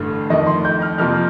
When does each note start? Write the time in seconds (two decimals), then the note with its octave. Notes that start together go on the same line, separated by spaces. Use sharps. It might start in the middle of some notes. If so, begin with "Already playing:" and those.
Already playing: A1 G2 D3 A3
0.30 F2 D#3 A3 D#5
0.47 C6
0.65 G6
0.82 F6
0.98 F2 C3 F3 A#3 F6